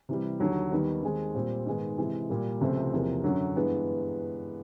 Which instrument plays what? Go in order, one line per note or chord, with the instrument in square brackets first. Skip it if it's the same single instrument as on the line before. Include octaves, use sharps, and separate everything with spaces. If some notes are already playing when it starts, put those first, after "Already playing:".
[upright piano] C3 E3 G3
D#2 D3 F#3
D#2 D#3 G3 B3 D#4
D#2 D#3 G#3 C4
A#2 G3 C4
G#2 D#3 G#3 B3
C3 E3 G#3
A#2 G3 A#3
C#2 C3 F3 A3 C4
E2 C3 F3 A#3
F#2 D3 F#3
G2 E3 G#3 B3